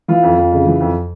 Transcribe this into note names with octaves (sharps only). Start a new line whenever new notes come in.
E3 F4
F2
F2
C#3
E3
F2